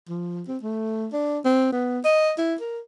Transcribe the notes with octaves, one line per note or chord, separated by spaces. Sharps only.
F3
C4
A3
D4
C4
B3
D#5
E4
A#4